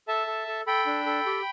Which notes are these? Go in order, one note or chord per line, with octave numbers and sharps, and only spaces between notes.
A4 E5 A5
A4
A4
A4 G5 B5
D4
A4
G4